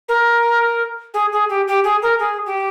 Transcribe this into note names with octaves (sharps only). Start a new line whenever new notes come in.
A#4
G#4
G#4
G4
G4
G#4
A#4
G#4
G4